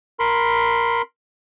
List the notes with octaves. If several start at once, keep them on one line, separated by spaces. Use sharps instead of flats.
A#4 B5 C6